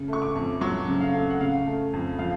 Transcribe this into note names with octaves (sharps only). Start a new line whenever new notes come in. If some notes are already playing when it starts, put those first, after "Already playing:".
Already playing: C#3
A3 C#6
D6
F2
F#3 C#6
C#3
F5
A3
F#5
C#3 F5
A3
F2
F3 F5